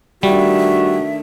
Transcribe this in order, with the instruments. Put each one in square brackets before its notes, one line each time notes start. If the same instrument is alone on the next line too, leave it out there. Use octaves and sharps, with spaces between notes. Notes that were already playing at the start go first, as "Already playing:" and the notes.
[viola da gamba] D#3 A3 D4 [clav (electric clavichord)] G3 [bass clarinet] F#4 [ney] E5